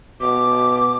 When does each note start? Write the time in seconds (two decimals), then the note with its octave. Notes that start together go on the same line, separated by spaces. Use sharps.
0.21 B2 D6